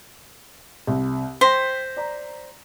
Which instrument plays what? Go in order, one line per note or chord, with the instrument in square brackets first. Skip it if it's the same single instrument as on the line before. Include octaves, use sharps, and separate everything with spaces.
[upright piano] C2
[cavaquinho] C5 [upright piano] G5 A#6 B6
[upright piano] D5 A#5